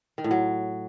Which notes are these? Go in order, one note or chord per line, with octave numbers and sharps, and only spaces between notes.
D#3
A2
F#3